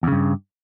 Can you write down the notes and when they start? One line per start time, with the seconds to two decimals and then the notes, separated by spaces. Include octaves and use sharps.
0.03 E2
0.07 C#3
0.12 G2